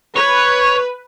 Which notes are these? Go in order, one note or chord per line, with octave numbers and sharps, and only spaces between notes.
B4 C#5